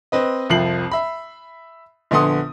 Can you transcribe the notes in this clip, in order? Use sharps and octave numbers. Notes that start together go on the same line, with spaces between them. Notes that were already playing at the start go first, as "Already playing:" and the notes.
C4 B4 D#5
C2 F2 F3 C7 F#7
E5 B5
A#1 D3 B3 F#5 C6 D#6